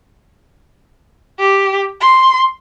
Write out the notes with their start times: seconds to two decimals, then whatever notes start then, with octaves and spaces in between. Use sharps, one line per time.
1.39 G4
2.01 C6